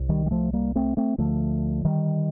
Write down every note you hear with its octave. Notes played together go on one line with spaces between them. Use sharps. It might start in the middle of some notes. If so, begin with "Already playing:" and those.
Already playing: C2
D#3 G3
G3
F3 A3
G3 A#3
A3 C4
A3 C4
D2 D3 F3 A3
D#3 G3